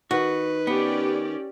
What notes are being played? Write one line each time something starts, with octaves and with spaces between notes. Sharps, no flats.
D#3 F#4 B4
B3 C#4 G4 D5